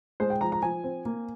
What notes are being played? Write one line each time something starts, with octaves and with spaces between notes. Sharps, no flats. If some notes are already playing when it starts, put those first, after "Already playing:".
G#3 C5
G5
F3 A#5
A#5
F3 G#5
C4
A#3